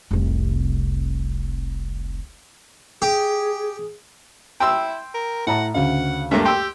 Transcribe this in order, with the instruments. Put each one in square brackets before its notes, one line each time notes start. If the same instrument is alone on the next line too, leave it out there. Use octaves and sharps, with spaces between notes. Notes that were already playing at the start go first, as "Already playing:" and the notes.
[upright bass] F1 C2
[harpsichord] G4 [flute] G#4
[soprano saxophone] E4 [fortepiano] G5 C6 E6
[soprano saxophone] A#4
[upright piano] A2 A5 A#5 [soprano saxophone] F#5
[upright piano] D2 C#3 F5 [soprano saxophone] F#5
[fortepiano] G2 A3 A#3 [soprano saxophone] E5
[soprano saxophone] G4 [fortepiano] G5 [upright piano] C6 E6